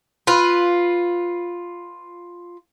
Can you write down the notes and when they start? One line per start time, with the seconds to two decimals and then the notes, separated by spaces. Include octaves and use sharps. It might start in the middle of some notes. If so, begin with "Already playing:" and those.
0.27 F4 B4